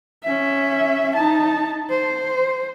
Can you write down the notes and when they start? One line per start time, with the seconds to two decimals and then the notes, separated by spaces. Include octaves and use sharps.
0.24 C#4 E5
1.16 D#4 A5
1.90 C5